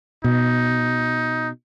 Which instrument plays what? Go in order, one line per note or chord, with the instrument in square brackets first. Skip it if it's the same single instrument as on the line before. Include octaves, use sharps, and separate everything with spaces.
[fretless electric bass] B2 [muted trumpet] D#4